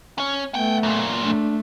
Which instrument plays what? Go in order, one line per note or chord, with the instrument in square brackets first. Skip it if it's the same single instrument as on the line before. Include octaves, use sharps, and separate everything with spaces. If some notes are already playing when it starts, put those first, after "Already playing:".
[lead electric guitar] C#4 C#5
[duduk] A3 [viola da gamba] B3 [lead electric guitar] F#5 G5
[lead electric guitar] F#2 A#2
[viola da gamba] A3 [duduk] D4